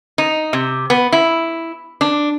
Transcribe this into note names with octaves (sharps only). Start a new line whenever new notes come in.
D#4
C3
B3
E4
D4